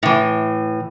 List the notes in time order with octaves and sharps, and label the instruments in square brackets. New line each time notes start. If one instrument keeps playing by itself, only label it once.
[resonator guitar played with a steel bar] A2 E3